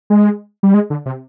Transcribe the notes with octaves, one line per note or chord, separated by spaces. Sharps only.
G#3
G3
G#3
D3
C3